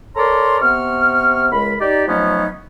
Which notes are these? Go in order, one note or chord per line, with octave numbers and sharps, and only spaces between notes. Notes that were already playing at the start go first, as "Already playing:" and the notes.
A4 A#4 C#5 D5 A#5 C6
C3 B3 C#6 F6
C#2 G#3 A#4 B5
D#4 G4 D5
F3 F#3 A3 B3 C#4 D#4